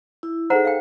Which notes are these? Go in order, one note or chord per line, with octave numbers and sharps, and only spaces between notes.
E4
D#4 G#4 A4 C5 F#5 A#5
F5 G5